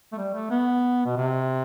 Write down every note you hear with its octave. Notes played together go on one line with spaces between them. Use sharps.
A3
G3
A3
B3
B2
C3